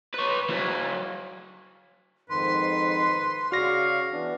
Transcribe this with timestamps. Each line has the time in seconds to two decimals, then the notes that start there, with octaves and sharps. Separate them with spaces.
0.14 B4 C#5
0.50 F#3 E4
2.29 F2 G#2 D#3 B4 C6
3.52 C#3 F#4 D5 F5 C#6 A#6
4.12 E3 B3 D4